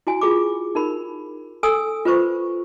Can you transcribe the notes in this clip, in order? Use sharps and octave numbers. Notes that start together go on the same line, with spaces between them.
E4 F#4 G#5
F4 G#4 D6
D#4 A#4 B5
A4 G#5 D#6 E6
F4 B4 C5 C#6